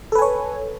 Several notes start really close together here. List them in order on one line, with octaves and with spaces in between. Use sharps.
A4 B4 G#5 C#5